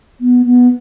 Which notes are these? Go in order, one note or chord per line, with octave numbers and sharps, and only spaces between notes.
B3
B3